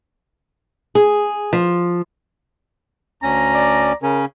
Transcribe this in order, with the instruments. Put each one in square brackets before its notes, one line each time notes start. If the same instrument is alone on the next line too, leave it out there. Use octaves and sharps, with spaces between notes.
[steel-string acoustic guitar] G#4
F3
[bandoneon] D2 C#4 [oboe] A#5
[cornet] D5
[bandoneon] C#3 C#4 [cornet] A#4